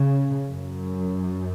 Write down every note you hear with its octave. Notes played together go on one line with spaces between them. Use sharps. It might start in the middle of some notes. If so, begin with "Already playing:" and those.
Already playing: C#3
F#2